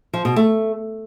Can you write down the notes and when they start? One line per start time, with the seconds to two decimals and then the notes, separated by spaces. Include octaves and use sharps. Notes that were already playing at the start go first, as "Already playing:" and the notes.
0.13 F3
0.25 B2
0.36 A3